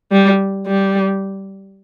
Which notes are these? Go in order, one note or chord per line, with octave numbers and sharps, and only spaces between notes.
G3
G3